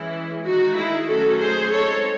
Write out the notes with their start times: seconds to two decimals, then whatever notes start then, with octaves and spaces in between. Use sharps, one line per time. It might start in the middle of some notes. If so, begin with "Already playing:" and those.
Already playing: E3 G#3 C#4 E4
0.45 D#3 G#3 D#4 F#4
0.77 E4 G#4
1.08 D#3 F#3 A3 C#4 F#4 A4
1.39 G#4 C5
1.71 G#3 C4 D#4 A4 C#5